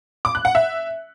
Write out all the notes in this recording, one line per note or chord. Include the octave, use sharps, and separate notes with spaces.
D6
F#6
F#5
E5